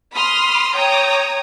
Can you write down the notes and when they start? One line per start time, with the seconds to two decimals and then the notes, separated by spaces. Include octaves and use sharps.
0.14 B5 C6 D#6 F6
0.74 C#5 G5 A#5 D#6